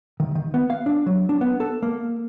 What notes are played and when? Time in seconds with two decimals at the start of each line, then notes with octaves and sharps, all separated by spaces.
0.20 D#3
0.35 D#3
0.54 B3
0.70 F5
0.86 D4
1.06 F#3
1.29 D4
1.41 B3
1.60 A4
1.83 A#3